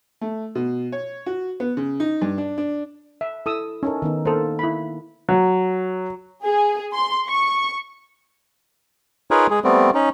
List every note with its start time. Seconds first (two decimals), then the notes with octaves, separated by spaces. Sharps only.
0.21 A3
0.55 B2
0.92 C#5
1.26 F#4
1.60 B3
1.77 C#3
2.00 D#4
2.21 G2
2.38 D4
2.58 D4
3.21 E5
3.46 E4 A4 D#6 E6
3.83 C#4 D#4 A4 A#4
4.02 D#3 B3 D#4
4.25 A#3 A4 A#4 C5
4.59 E4 B5
5.29 F#3
6.43 G#4
6.93 C6
7.27 C#6
9.31 D#4 F4 G#4 A#4 B4 C#5
9.51 G#3 G#4
9.64 G3 A3 B3 C4
9.95 C#4 D#4